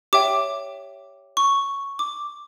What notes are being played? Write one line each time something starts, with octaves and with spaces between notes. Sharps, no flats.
G4 C#5 E5 G5 D6
C#6
D6